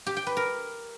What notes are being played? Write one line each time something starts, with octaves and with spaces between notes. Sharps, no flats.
G4
G5
B4
A#4